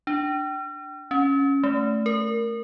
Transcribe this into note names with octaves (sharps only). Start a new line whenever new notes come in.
D4
C#4
A3
A#4